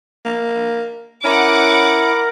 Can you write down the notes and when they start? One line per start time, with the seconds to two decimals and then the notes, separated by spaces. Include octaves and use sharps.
0.25 A#3
1.24 C#4 E4 A#4 F#5 D6